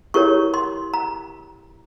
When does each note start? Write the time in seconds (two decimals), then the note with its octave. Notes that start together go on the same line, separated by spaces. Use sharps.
0.14 E4 G4 A#4 C#5 C#6
0.54 C6
0.94 A#5